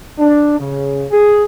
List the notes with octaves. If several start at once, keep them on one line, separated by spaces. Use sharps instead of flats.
D4
C#3
G#4